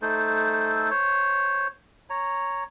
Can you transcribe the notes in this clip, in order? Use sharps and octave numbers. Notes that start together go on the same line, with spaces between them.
A3 D#4 A4 C5
C5 C#5
C#5 A#5